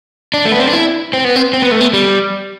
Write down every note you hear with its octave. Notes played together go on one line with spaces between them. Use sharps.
D4
A3
B3
C4
D4
E4
C4
B3
C4
C4
B3
A3
B3
G3